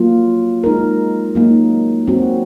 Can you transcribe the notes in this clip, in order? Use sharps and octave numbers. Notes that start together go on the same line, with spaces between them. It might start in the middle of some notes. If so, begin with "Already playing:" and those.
Already playing: F#3 A#3 F4
G#3 D#4 A#4
F#3 A#3 D#4
F#3 C4 F#4